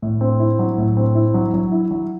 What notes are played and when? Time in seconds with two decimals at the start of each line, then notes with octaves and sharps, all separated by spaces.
0.02 A2
0.21 C4
0.40 E4
0.59 F#3
0.78 A2
0.97 C4
1.15 E4
1.34 F#3
1.54 F#3
1.72 E4
1.91 F#3